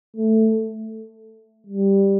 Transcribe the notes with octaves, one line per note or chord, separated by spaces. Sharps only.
A3
G3